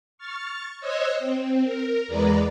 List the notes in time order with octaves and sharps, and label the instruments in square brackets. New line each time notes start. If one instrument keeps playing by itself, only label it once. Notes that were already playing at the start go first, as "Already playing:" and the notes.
[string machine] C#6 F6 A6
C5 C#5 D#5 E6 F#6 G#6
C4
A#4
E2 G#3 B4 D5 A#5